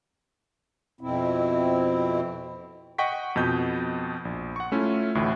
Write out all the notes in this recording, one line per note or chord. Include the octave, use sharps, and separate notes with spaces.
F2 B2 C4 E4
D#5 F#5 G5 C#6 B6
F2 B2 D#5 G6
A#1
F#5 C#6
A3 C#4 E4 F4
A1 D2 A2